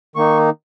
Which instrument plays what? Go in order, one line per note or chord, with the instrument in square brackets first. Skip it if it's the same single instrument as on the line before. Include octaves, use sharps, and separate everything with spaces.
[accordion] D#3 A#3 D#4 C#6